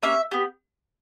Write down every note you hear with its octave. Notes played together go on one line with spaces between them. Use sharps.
A#3 C#4 G4 E5
B3 G4